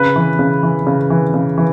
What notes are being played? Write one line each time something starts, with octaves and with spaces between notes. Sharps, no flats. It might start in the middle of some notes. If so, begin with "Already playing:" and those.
Already playing: C#3 B4
E3
C#3
E3
C#3
E3
C#3
E3